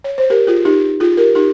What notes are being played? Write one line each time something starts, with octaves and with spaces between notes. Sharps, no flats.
C#5
C5
G4 A#4
F4 G#4
D#4 G4
F4 G#4
G4 A#4
D#4 G4